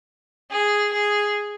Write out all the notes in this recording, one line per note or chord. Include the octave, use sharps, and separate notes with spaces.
G#4
G#4